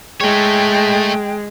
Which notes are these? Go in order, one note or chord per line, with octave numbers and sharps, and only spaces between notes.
G#3 A3 C#5 G5